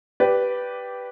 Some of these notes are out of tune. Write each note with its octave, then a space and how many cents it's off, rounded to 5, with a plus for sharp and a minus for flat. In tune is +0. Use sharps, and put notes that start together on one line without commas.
G4 -10 B4 +0 D5 +0